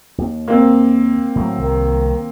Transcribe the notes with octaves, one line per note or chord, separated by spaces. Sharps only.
D#2
A#3 C4
A2 D#3 F#3
C2 D#3